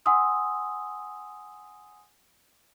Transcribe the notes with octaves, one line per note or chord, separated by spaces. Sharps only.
F#5 G#5 C6 D#6 E6